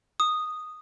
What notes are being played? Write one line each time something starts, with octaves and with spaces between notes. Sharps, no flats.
D#6